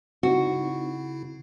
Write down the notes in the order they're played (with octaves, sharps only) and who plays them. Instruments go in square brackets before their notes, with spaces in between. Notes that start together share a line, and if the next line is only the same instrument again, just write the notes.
[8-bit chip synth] C#3 E4 [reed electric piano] C4 D#4 [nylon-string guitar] F#4